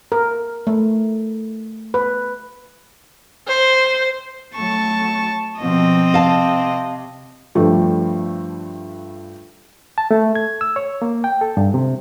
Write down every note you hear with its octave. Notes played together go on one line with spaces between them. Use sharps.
A#4
A3
B4
C5
F#3 A3 A5 C#6
B2 F3 C4 D#5
C3 F5 A5
G2 F3 G3 A3
A5
A3
G#6
E6
C#5
A#3
G5
A4
G2
C3